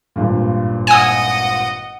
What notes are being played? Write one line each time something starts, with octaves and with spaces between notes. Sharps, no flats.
G#1 G2 A#2
D#5 F#5 G#5 D#6